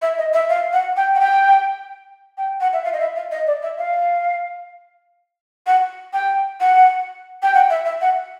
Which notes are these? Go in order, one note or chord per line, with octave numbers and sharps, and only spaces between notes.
E5
D#5
E5
F5
F#5
G5
F#5
G5
G5
F#5
E5
F5
D#5
E5
F5
D#5
D5
E5
F5
F#5
G5
F#5
G5
F#5
E5
E5
F#5